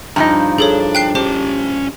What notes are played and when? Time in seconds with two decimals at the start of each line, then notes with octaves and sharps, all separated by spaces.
0.16 G2 F3 D#4
0.58 D4 G#4 A4 C#5
0.95 G5 F#6 C7
1.15 C#4 G4 C5 A5